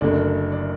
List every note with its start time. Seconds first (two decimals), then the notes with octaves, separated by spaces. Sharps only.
0.01 F#1 F#2 D3 A3 D5
0.52 D5